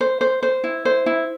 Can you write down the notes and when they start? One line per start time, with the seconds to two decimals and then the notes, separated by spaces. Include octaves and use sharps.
0.01 C5
0.21 C5
0.43 C5
0.64 E4
0.85 C5
1.06 E4